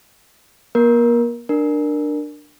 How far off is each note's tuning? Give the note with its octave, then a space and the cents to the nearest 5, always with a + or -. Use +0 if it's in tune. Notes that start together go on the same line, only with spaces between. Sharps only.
A#3 +40 A#4 +20
D4 +15 A#4 +0